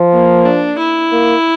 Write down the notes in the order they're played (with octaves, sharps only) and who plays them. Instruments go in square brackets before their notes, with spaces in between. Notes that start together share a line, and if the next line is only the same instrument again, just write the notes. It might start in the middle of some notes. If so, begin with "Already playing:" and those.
Already playing: [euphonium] F3
[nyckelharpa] A#3
D4
E4
[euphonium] A#3